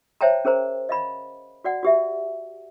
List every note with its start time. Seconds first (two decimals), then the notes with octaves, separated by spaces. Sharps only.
0.21 C5 C#5 E5 G5 A5 A#5
0.45 C#4 G#4 A#4 C5 A#5
0.89 D#5 F5 B5
1.64 F#4 D5 F#5
1.83 F#4 G4 E5